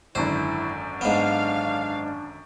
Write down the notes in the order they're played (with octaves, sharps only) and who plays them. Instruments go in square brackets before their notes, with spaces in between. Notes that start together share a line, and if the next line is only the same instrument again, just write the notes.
[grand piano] G#1 F#2 D3 [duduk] E4 [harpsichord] C5
[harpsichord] G#2 B3 [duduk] D4 [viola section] F5